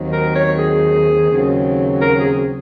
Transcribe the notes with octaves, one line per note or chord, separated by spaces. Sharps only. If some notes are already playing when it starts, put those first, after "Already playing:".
Already playing: D#2 D#3 F#3 C4
A#4
C#5
G#4
D#2 C#3 F#3 C4
A#4
G#4